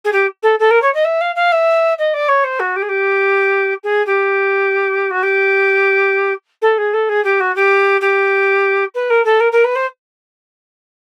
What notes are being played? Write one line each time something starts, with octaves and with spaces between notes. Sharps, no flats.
G#4
G4
A4
A4
A#4
C#5
D#5
E5
F5
F5
E5
D#5
D5
C#5
C5
F#4
G4
G#4
G4
G#4
G4
F#4
G4
A4
G#4
A4
G#4
G4
F#4
G4
G4
B4
A#4
A4
A#4
A#4
B4
C5